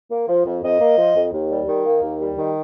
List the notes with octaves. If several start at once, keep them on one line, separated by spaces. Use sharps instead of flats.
A#3
F3
F2
F2 D#5
A#3
F3
F2
D#2
G3
D#3
A#3
D#2
G3
D#3